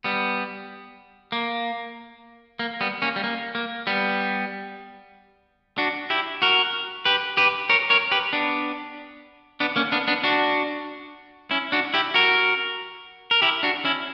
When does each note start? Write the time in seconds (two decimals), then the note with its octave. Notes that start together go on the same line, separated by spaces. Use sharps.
0.04 G3 B3
1.32 A#3
2.59 A#3
2.81 G3 B3
3.02 A#3 C#4
3.16 G3
3.24 A#3
3.55 A#3
3.87 G3 B3
5.78 D4 F#4
6.10 E4 G4
6.42 F#4 A#4
7.05 G4 B4
7.37 G4 B4
7.69 A#4 C#5
7.90 A#4 C#5
8.12 G4 B4
8.33 B3 D4
9.60 B3 D4
9.76 A#3 C#4
9.92 B3 D4
10.08 B3 D4
10.23 D4 F#4
11.51 C#4 E4
11.72 D4 F#4
11.94 E4 G4
12.14 F#4 A#4
13.31 A#4
13.42 E4 G4
13.63 D4 F#4
13.85 C#4 E4